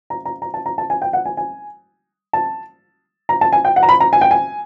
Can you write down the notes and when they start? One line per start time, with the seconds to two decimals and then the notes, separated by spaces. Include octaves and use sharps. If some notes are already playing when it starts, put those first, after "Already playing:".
0.10 A#5
0.25 A#5
0.42 A#5
0.54 A5
0.66 A#5
0.78 A5
0.90 G#5
1.02 G5
1.13 F#5
1.25 G#5
1.37 G#5
2.33 A5
3.29 A#5
3.41 A5
3.53 G#5
3.65 G5
3.76 F#5
3.83 A#5
3.89 B5
4.00 A#5
4.13 G#5
4.21 G5
4.31 G#5